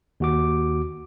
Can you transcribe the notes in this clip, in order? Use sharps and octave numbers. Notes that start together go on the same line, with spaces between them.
D#2 F#4 D6